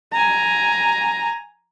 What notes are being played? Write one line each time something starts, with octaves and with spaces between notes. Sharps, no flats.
G#5 A#5